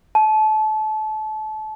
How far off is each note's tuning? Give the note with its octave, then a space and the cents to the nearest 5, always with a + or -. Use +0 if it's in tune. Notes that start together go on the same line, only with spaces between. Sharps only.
A5 -30